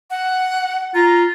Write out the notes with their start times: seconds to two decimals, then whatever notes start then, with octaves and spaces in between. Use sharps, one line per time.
0.10 F#5
0.95 F4 A#5